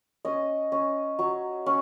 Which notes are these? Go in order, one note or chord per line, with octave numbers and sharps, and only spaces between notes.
C#4 D#5
C#4
F#3
C#4